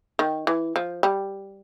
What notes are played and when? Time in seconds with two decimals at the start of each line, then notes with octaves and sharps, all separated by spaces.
0.19 D#3
0.47 E3
0.76 F3
1.03 G3